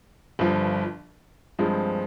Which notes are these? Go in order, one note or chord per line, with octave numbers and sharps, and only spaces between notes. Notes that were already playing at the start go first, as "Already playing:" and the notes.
G1 G2 F3
G2 F3 G#3 C4